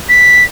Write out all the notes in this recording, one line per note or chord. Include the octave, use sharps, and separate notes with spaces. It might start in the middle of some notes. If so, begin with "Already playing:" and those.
B6